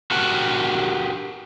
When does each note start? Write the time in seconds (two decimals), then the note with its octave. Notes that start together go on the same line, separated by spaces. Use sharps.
0.11 F#4 G4 A#4 F#5 A5